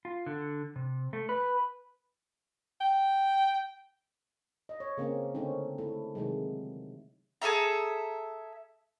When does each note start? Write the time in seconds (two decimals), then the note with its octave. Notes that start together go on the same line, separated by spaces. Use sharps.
0.05 F4
0.26 D3
0.76 C3
1.13 A3
1.29 B4
2.80 G5
4.69 D#5
4.80 C#5
4.98 C#3 A#3 C4 C#4
5.34 D3 A3 C4 C#4 D#4
5.78 A3 E4
6.15 C3 D#3 F#3 G#3
7.42 G#4 A4 E5 A#5